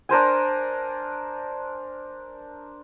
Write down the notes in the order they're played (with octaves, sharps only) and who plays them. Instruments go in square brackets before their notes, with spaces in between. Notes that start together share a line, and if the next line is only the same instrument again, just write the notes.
[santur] D4 A#4 C5 G#5